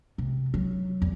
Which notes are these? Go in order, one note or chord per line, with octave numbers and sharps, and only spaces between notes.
C3
F#3
E2